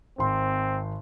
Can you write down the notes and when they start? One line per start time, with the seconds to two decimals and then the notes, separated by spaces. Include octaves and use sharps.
0.18 G#1 C4 C6